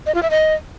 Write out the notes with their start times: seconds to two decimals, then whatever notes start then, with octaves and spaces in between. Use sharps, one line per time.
0.06 D#5
0.14 F4
0.22 E5
0.31 D#5